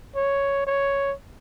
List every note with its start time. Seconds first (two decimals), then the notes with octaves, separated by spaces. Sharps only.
0.16 C#5
0.67 C#5